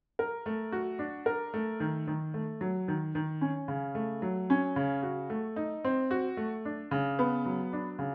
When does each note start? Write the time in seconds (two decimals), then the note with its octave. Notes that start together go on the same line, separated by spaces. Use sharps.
0.19 A#4
0.46 A3
0.72 F#4
0.99 D4
1.26 A#4
1.54 A3
1.80 D#3
2.07 D#3
2.34 A3
2.61 F#3
2.88 D#3
3.15 D#3
3.41 C#4
3.68 C#3
3.95 A3
4.22 F#3
4.50 C#4
4.76 C#3
5.03 F#4
5.30 A3
5.56 D#4
5.85 C4
6.11 F#4
6.37 A3
6.65 D4
6.91 C#3
7.19 B3
7.45 F#3
7.73 D4
7.99 C#3